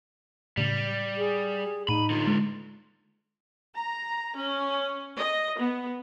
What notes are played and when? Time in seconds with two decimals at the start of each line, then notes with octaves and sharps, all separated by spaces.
0.57 A2 C#3 G3
1.18 G#4
1.89 A2 D#4 B5 D#7
2.10 D3 F4
2.27 G#3
3.75 A#5
4.36 C#4
5.17 D#5
5.61 B3